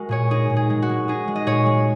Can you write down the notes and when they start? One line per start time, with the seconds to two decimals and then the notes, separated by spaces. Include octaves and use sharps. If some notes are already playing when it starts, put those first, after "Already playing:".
Already playing: G#3 F#4 A#4
0.09 A#2 G#4 C#5
0.31 D#4 G#4
0.50 A#2
0.56 G#4
0.70 G#3
0.82 F#4
0.89 G#3
1.08 D#4 G#4
1.28 G#3
1.36 D#5
1.46 A#2 G#4 C#5
1.66 G#3